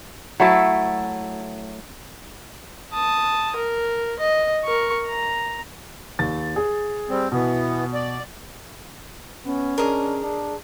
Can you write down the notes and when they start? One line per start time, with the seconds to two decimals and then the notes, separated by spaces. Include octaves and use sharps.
0.40 F#3 A3 E4 A4
2.93 A5 D#6
3.56 A#4
4.19 D#5
4.64 A#4 C#6
5.06 A#5
6.19 D#2 A6
6.56 G#4
7.09 G3 C4
7.32 B2 E3 B3
7.93 D5
9.45 B3 C#4
9.78 D4 G#4 A#4 D#5
10.22 D4